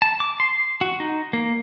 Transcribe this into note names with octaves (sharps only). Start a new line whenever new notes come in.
A5
D6
C6
F#4
D#4
A#3